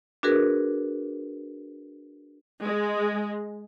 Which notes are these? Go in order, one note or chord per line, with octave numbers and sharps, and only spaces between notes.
D4 F#4 G#4 A#4 B4
G#3